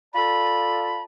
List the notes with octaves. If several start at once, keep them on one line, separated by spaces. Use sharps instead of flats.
F4 A4 D5 A5 B5